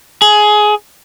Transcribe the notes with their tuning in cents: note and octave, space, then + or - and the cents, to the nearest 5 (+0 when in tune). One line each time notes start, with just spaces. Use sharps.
G#4 +15